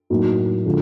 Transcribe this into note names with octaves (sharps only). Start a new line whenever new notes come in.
A2 F#3 A#3 D#4 F#4
D3 F3 G#3